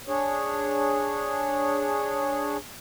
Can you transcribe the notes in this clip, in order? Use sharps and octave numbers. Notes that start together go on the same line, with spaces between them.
D4 G#4 C#5